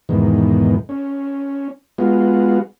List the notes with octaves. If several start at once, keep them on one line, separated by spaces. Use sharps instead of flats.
E2 G#2 B2 D#3
C#4
G#3 B3 F4 F#4